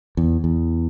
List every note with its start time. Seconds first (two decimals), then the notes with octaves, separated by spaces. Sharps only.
0.17 E2
0.44 E2